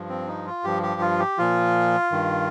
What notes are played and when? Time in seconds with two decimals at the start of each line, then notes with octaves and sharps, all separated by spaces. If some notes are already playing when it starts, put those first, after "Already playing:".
Already playing: G2 F3
0.09 C4
0.27 D#4
0.46 F4
0.64 G2 F3 G4
0.83 G4
1.01 F4
1.19 G4
1.38 A#2 F3 F4
2.11 G2 D#3